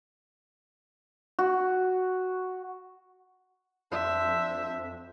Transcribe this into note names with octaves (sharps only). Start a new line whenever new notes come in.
F#4
F2 D4 C5 E5